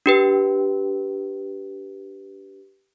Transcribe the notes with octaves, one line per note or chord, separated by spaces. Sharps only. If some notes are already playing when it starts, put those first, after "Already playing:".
D4 G4 B4